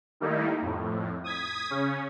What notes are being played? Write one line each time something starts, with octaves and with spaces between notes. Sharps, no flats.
D#3 G3 A3 A#3 D#4 E4
F2 A2
D#6 G#6 B6
C#3 C#4